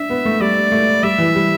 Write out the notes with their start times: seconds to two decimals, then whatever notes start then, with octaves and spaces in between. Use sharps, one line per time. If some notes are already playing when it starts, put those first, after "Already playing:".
Already playing: D4 E5
0.10 B3
0.25 A3
0.40 G3 D5
0.72 A3
1.03 G3 E5
1.18 E3
1.35 G3